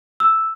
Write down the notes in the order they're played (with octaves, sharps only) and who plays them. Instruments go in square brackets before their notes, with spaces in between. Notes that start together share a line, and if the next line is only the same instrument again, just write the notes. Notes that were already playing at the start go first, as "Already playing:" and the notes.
[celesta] E6